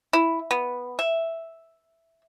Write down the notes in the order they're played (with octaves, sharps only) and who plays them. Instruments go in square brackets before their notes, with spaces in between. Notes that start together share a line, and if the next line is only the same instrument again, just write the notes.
[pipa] E4
B3
E5